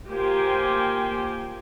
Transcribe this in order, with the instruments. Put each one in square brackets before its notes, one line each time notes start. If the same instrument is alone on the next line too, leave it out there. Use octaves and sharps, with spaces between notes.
[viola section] A#3 F4 G4 C5 G5 G#5